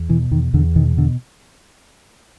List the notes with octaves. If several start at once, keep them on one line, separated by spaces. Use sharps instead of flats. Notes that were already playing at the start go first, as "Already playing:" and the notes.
Already playing: E2
B2 E3
E2 D#3
E2 D3
B2 D#3
B2 D3